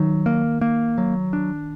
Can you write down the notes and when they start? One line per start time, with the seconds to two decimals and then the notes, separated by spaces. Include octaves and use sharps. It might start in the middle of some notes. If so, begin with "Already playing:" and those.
Already playing: D#3 F#3
0.26 A#3
0.61 A#3
0.98 F#3
1.33 D4